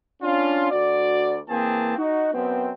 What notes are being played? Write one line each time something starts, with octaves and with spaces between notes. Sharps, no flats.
C#4 D4 F4
D2 F#4 D5
E3 A#3 C4 G#4 A5
D#4 F#4
F#2 B3 C4